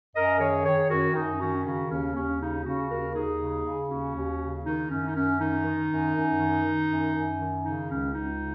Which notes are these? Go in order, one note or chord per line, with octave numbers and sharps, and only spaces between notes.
F#2 A#4 D#5
D#3 G#4 C#5
D#3 G#4 C#5
F#2 F#4 A#4
F#2 D#4
D#3 C#4 F#4
C#3 C#4 F#4
D#2 C#4
D#2 C#4
C#3 D#4
C#3 C#4 F#4
D#2 F#4 A#4
D#2 D#4 G#4
C#3
C#3
D#2 C#4 F#4
D#2
C#3
D#3 D#4
F#2 C#4
D#4
F#2 C#4
D#3 D#4
D#3
F#2
F#2
D#3
D#3
F#2
F#2
D#3
C#3 D#4
C#2 C#4
C#2 D#4
C#3